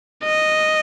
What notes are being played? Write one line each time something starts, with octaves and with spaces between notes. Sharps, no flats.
D#5